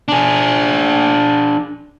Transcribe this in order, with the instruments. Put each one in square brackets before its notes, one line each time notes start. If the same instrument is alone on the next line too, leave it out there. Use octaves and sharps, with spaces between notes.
[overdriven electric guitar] D4 G#4